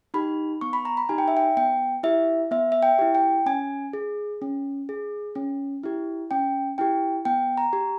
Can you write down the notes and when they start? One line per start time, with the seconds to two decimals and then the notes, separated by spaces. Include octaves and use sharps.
0.14 D#4 G4 B5
0.61 B3 C#6
0.73 B5
0.85 A#5
0.97 B5
1.09 D#4 G4 G#5
1.18 G5
1.28 E5
1.37 G5
1.57 B3 G5
2.03 E4 G4 E5
2.51 B3 E5
2.72 E5
2.83 G5
2.99 E4 G4
3.15 G5
3.46 C#4 G#5
3.93 G#4
4.42 C#4
4.89 G#4
5.35 C#4
5.83 E4 G4
6.31 C#4 G5
6.78 E4 G4 G5
7.25 B3 G5
7.58 A#5
7.73 G4